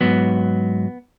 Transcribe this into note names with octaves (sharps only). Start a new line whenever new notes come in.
G#2 F#3 B3